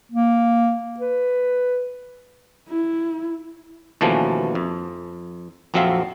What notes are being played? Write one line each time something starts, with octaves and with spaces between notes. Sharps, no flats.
A#3
B4
E4
D#2 B2 E3 F3 A3 C#4
F2
A#1 F2 F#3 C4 E5 F5